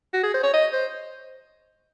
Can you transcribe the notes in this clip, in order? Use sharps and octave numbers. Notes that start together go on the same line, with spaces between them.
F#4
G#4
C5
C#5
D#5
C5